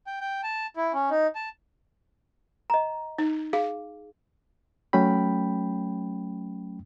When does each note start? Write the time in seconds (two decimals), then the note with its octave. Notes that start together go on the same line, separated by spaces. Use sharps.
0.07 G5
0.21 G5
0.43 A5
0.77 E4
0.94 C#4
1.10 D#4
1.35 A5
2.70 D#5 A#5
3.18 D#4
3.53 G#4 F5
4.93 F#3 A3 C#4 G5 B5